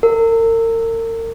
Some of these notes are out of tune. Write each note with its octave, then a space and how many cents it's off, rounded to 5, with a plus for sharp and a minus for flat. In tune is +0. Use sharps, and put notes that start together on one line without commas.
A#4 -40